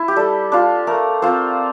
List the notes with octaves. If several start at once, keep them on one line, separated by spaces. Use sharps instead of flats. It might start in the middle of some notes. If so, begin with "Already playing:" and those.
Already playing: E4
G4
G3 A4
D4 F4
A3 A#4
C4 F4 C5